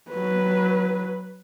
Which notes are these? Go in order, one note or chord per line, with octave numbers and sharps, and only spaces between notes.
F#3 B4